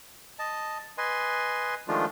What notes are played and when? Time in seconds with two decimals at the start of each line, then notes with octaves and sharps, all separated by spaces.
0.39 D#5 A5
0.98 B4 D#5 G#5 C6
1.88 D#3 F3 G#3 A3 D4 F4